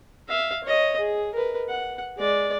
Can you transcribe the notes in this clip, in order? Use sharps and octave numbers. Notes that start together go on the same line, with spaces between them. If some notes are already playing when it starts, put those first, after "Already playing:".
E5 F5
C#5 D#5
G#4
A#4 B4
F#5
G#3 D5